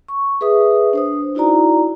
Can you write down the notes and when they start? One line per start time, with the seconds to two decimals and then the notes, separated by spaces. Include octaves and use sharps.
0.08 C#6
0.41 G#4 B4 E5 D#6
0.93 D4 C5 D#6
1.35 D#4 E4 F#4 D5 A#5